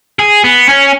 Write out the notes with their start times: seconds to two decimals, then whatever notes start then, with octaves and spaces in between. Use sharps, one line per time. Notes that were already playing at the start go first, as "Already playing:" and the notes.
0.19 G#4
0.44 B3
0.69 C#4